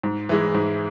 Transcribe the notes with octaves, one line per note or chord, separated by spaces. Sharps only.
G#2
E3 G#3 E4
G#2